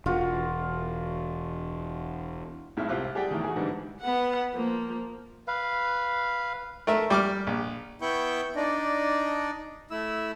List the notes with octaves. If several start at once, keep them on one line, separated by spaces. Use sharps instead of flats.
E1 F4 F#4
B1 A2 G#3 E5 F6
C2 C4 F4 G4 F6 F#6
G3 G4 G#4 D5 F#5 G5
E2 A2 D#3
F#4 G#4
G#2 D3 E3 G3 G#3
B3 F#5
F3 A#3
B4 F5
A3 A#4 E5
G3 D6 F6
A#1
B3 E4 G5 C#6 G6
D4 D#4 D5 D#5
A3 E4 E6